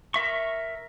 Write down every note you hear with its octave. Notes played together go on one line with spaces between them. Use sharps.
A#4 E5 C#6